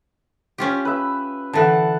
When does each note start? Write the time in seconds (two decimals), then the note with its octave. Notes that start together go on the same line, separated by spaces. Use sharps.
0.58 C#4 F4 G4
0.85 B4 E5
1.53 D3 E3 F#5 A5